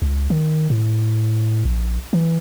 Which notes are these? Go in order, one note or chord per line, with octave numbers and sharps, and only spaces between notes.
C#2
D#3
A2
A#1
E3